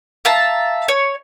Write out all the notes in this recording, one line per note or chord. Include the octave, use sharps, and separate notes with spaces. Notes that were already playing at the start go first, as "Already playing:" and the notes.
E5 F5 A5 A#5
C#5